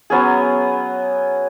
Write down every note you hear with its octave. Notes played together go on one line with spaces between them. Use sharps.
F#3 B3 C#4 G#4